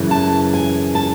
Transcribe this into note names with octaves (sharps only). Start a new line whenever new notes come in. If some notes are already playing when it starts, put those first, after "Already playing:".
Already playing: F#2 C#3 E3
A5
G#5
A5